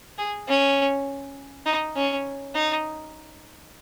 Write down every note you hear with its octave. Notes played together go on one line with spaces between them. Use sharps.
G#4
C#4
D#4
C#4
D#4